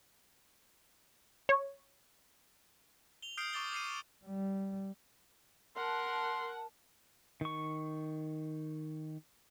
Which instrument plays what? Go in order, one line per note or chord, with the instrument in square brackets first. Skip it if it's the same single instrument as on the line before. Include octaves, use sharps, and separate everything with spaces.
[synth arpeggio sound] C#5
[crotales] F7 G7
D#6 F6 G6 C7 D7
C#6 D6 A6 G7
D6 G6 C7 C#7 D#7
[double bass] G3
[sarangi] A#4 [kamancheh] F#5 F#6 [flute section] A5 [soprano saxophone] C6
[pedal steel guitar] D#3 C#6